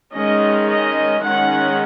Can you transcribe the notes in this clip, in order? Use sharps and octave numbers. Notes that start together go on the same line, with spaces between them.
D#3 G#3 C#4 D#5
D#5
D#3 G#3 C#4 F#5